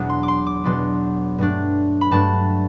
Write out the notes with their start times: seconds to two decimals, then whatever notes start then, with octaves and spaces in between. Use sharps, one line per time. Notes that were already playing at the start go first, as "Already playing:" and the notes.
Already playing: E2 B2 F#3 B3 D4
0.10 C6
0.23 D6
0.28 C6
0.47 D6
0.64 E2 B2 F#3 B3 D4 C6
1.38 G2 F#3 A3 D4
2.01 B5
2.11 G2 F#3 A3 D4 A5